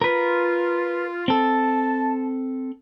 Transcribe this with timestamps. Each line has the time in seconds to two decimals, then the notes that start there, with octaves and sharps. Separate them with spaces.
0.02 F4 A#4 B4
1.28 C4 A4 A5